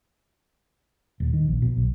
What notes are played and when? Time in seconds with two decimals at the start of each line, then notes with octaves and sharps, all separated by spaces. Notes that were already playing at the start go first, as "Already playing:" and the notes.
1.20 D#1
1.33 D#3
1.48 A#1
1.62 B2
1.77 B1